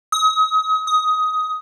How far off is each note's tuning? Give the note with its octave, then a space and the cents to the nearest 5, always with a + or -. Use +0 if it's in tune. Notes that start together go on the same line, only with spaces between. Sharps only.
D#6 +35
D#6 +15